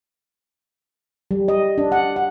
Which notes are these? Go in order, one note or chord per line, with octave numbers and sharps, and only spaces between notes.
G3
D#5
D4
F#5
F#5